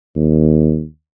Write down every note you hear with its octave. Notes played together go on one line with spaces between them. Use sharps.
D#2